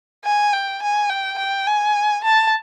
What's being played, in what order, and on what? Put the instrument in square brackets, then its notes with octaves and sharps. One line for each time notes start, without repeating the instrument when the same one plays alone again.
[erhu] G#5
G5
G#5
G5
G5
G#5
A5